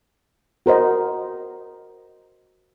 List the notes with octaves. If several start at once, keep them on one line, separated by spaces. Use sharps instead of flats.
F#4 A#4 C5 D#5